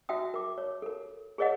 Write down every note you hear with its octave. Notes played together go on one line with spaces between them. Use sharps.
F#4 E5 G5 D#6
A#4 D6
C#5
A4 A#4
G#4 A#4 C#5 D#5 F#5